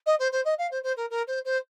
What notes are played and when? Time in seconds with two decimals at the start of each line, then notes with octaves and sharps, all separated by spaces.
0.06 D#5
0.19 C5
0.32 C5
0.45 D#5
0.59 F5
0.71 C5
0.83 C5
0.97 A#4
1.10 A#4
1.27 C5
1.45 C5